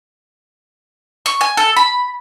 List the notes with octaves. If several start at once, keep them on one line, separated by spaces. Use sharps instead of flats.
C#6
G#5
A4
B5